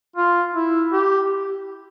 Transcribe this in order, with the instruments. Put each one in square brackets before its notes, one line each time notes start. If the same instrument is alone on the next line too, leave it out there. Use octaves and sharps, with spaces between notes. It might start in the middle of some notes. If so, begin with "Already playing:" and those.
[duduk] F4
E4
G4